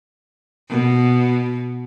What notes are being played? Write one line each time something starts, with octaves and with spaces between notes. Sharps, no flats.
B2